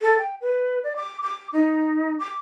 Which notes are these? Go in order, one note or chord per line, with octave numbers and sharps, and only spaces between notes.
A4
G5
B4
D5
D6
D6
D#4
D6